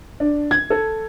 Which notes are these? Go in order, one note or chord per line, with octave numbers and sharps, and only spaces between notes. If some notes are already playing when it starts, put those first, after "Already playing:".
D4
G#6
A4